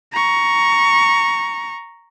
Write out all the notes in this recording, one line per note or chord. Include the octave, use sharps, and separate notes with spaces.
A#5 C#6